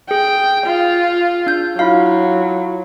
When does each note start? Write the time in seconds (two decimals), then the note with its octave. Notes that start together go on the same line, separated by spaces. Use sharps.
0.11 G#4 G5
0.67 F4
1.47 D4 G6
1.79 F#3 E4 F4 F5